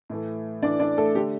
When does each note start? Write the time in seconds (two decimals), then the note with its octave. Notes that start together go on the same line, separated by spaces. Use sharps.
0.10 A2 E3 A3
0.62 A2 E3 A3 D4 D5
0.80 D4 D5
0.97 A3 A4
1.15 D3 A3 G4